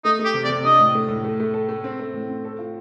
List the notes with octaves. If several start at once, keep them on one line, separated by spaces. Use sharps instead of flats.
A3 D#4
A3
G4
C3
D5
C3
D4 D#5
A2
A3
A2
A3
A3
A4
A3
C4
A3
A2
C4
A4
F4